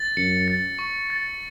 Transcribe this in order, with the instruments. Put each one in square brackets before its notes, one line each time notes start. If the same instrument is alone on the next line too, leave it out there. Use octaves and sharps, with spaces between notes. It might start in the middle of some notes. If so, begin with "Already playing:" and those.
Already playing: [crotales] A6
[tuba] F#2 [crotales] C#7
[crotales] A6
C#6
A6